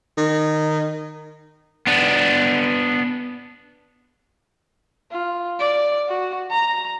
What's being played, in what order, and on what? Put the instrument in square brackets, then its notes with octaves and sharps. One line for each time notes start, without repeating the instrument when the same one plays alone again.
[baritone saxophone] D#3
[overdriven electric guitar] B3 D4
[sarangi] F4
D5
F#4
A#5